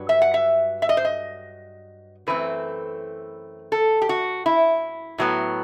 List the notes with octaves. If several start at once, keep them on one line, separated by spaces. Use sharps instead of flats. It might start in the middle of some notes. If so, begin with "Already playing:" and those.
Already playing: G2 F#3
E5
F#5
E5
E5
D#5
C5
D#5
F#2 E3 A3 C4 B4
A4
G4
F#4
E4
A2 F#3 B3